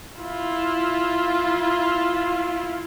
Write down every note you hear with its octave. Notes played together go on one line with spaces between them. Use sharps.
E4 F4